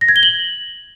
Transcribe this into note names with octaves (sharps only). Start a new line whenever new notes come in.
A#6
G#6
G7
F#7